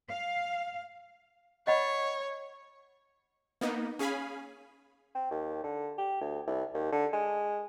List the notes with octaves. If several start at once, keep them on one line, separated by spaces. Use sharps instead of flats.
F5
C#5 D#5 F#5 B5
A#3 B3 D#4
C#4 G#4 F5 G#5 B5
C4
D#2
D3
G4
D2
C2
D#2
D3
G#3